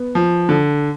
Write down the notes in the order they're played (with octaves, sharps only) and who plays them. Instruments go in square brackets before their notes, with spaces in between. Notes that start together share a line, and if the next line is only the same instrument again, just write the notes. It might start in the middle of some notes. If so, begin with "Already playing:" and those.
Already playing: [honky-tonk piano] B3
[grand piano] F3
D3